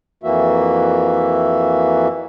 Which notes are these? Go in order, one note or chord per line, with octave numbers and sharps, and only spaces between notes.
F2 E3 A#3 F#4 E5